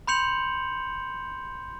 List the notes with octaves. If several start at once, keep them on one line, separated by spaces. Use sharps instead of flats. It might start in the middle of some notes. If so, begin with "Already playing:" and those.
B5 C6 G6 C#7 F7 F#7